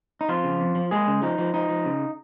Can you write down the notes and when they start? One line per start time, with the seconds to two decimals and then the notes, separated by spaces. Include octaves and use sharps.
0.21 D#4
0.29 F2 F3 F4
0.44 C#3
0.61 F2
0.75 F3
0.91 G#3 A#3 G#4
1.07 C#3
1.22 F3 D#4
1.38 F3
1.54 F3 D#4
1.69 F3
1.85 C#3